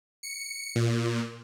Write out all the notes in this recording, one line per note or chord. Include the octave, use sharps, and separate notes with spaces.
C#7
A#2